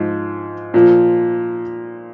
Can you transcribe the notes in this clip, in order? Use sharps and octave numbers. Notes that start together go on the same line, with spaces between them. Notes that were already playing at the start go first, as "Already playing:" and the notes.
Already playing: G#2 F3
A#2 F3